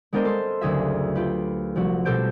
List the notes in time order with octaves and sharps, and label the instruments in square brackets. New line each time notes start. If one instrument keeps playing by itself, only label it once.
[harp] G#3 B3 D4 A#4 C5 D#5
A4 C6
F#1 D2 G#4 E5
F4 G4 B4
C2 F3 F#4
B2 G4 A4 C5 G6 D7